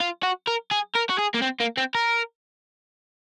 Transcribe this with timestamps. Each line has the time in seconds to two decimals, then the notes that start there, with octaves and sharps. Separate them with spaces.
0.01 F4
0.23 F#4
0.48 A#4
0.71 G#4
0.95 A#4
1.10 F#4
1.18 G#4
1.34 A#3
1.42 C4
1.60 A#3
1.77 C4
1.95 A#4